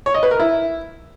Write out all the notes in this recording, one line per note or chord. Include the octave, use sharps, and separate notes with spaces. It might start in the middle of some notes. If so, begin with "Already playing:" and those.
C#5
D#5
B4
A#4
E4